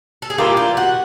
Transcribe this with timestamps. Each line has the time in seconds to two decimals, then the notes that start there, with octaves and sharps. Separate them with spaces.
0.22 A4
0.30 G#4
0.38 E3 G3 A#3 D4 F4 G4
0.57 G4
0.77 F#4